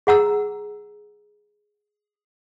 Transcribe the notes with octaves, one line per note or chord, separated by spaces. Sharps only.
G#4 F#5 A#5 E6